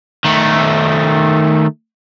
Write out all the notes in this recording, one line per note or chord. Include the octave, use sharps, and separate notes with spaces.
D#3 A3